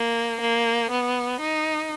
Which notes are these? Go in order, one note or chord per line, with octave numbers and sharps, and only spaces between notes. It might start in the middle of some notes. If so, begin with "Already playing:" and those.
Already playing: A#3
A#3
B3
D#4